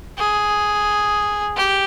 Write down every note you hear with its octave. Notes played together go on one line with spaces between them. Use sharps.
G#4
G4